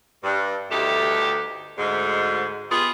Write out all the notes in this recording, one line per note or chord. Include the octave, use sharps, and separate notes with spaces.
G2
D2 G2 A3 D#4 G4
D2 G#2
B3 F4 G4 G#4